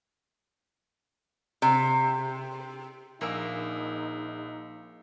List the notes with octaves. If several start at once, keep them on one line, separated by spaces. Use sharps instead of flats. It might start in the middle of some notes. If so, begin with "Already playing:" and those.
C3
A#1 A#3 D#4 G#4 D6 E6